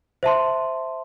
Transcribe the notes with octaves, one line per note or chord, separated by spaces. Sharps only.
C5 E5 A5 C6